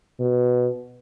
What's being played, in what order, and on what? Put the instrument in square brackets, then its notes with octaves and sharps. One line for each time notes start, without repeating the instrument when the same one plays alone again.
[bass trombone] B2